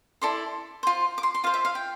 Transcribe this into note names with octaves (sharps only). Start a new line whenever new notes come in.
E4 A4 D5 C6
F4 C5
D6
C6
C6
F4 C5 F5
E5
F5
G5